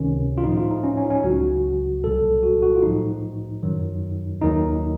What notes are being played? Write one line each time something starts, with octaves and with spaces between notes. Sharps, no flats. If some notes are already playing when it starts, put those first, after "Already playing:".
Already playing: C#2 C3 D#3 C#4
F4
A2 F3 D#4
F4
D#4
C#4
C#4
D#4
C#4
C#2 C#3 F#3 F#4
C2 A#2 F#3 A4
F#4
F#4
F4
A2 F3 D#4
F#2 D#3 F#3
D#2 D#3 F#3 D#4